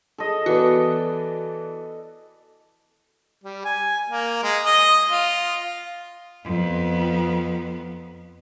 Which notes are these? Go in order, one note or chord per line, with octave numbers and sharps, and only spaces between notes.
A4 D#5
E3 B3 F#4 D5
G3
G#5
A#3
G#3
D#5
F4
F2 B3